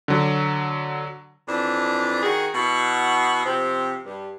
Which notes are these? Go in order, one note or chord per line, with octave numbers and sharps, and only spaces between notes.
D3 F#3
F2 E3 D4
D#3 F#4 G#4
B2 E4 F#4
C3 F3 C4
G2